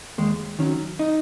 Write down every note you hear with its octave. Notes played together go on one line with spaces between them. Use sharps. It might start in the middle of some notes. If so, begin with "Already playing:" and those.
D#2 G#3
D#3 F#3 C#4
D#4